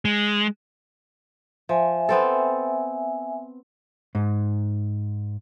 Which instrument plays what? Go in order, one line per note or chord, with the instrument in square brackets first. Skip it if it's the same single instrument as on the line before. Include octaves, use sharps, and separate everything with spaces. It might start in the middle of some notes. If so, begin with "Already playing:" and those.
[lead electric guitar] G#3
[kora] F3 [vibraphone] E5 G#5
[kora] B3 C4 A4
[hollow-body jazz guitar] G#2